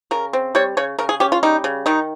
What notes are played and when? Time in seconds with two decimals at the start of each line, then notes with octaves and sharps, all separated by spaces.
0.11 C#3 A#4
0.33 C4
0.55 G3 C#5
0.77 C#3 C#5
0.99 C#3 A#4
1.09 G#4
1.20 C#4 G4
1.32 F4
1.43 G3 D#4
1.64 C#3
1.86 D#3 D#4